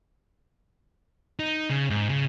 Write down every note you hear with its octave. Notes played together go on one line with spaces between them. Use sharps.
D#4
C#3
G#2
C#3